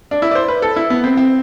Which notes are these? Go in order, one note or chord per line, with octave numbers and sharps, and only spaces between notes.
D4
E4
D5
C5
B4
A4
E4
B3
C4
C4